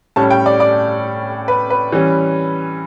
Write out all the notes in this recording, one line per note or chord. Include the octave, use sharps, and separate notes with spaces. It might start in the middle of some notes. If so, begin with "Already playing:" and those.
A2 G3 C#4 A5
G5
D5
D5
B4
B4
E3 G3 C#4